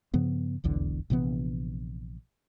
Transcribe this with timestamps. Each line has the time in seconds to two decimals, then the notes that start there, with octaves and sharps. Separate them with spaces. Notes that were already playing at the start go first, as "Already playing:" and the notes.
0.14 G2 C#3 F3 B3
0.64 F1 B1 E2 D3
1.10 A#1 C3 E3 B3